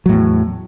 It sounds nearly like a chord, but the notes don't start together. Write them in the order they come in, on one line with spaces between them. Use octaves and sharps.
F#3 A2 E2